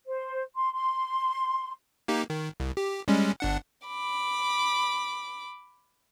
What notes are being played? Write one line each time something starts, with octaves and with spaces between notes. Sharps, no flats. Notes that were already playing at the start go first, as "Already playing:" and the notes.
C5
C6
C6
A#3 D#4 G4
D#3
C2
G4
G3 G#3 C#4
G1 D4 F#5
B5 D6